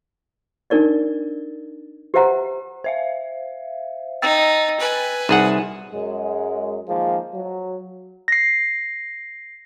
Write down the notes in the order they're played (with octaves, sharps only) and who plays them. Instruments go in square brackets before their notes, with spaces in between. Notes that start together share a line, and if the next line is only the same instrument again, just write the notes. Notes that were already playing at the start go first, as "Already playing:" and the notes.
[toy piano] D4 D#4 A#4 D5 D#5
G4 B4 C5 E5 F#5 A#5
[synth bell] C5 E5 F5
[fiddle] D#4 [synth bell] G5 E6 A6
[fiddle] B4 G#5
[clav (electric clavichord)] C2 G#4 F#5 [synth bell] D#4 D#7 E7
[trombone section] F#2 G#3
D#3 F3 G#3 A#3
F#3
[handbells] A#6 C7